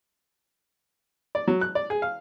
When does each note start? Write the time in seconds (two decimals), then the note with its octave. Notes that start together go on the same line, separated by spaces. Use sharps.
1.35 D5
1.48 F#3
1.61 F#6
1.75 D5
1.90 G#4
2.02 F5